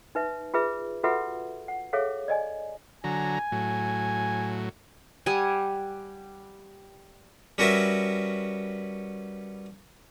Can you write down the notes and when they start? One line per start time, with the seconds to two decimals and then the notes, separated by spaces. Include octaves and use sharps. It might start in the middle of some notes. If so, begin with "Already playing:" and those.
0.15 D#4 B4 E5
0.54 F4 G#4 B4 E5
1.04 F4 F#4 A4 B4 E5 F#5
1.68 F#5
1.93 G#4 A4 C#5 E5 F5
2.28 D5 D#5 G#5
3.04 D3 F#3 G#5 A#5
3.52 A2 F#3
5.26 G3 F#5 G#5
7.58 G3 C#4 F#4 A#4 B4 E5